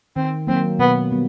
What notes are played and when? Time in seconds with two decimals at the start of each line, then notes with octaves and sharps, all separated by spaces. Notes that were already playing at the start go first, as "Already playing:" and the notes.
0.16 D#3 C4
0.47 F#3 A#3 C4
0.79 B2 B3
1.12 G3 B3